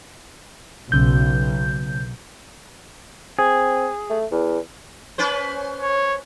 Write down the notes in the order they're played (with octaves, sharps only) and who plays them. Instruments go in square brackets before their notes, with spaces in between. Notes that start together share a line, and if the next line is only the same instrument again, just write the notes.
[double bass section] B1 [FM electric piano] C#3 G6
[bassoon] C4 [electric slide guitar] G#4
[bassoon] A3
E2
[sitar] C#4 B4 C5
[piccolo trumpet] C#5